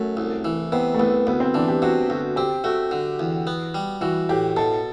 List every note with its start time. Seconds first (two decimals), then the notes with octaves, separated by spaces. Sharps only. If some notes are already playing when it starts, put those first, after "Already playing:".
Already playing: F#2 A3
0.17 C2
0.45 E3
0.72 C3 B3
0.94 A3
0.99 C2 B3
1.27 D2 B3
1.40 C4
1.54 E3 D4
1.68 G4
1.82 C3 F#4
2.09 D2 F#4
2.36 C4 G4
2.64 A3 F#4
2.91 D3 F#4
3.19 E2
3.47 B3
3.74 G3
4.01 E3 F#4
4.29 A2 G4
4.57 B2 A4